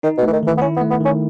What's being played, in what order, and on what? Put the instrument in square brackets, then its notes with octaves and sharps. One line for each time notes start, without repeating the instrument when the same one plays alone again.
[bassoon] D#3 [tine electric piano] D#4
[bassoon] B2
[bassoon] E3 [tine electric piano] A3
[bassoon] D#3
[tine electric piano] D#3 [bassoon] E3
[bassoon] B3
[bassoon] C#4 [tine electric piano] E4
[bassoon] B3
[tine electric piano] A3
[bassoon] B3
[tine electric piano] D#3 [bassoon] C#4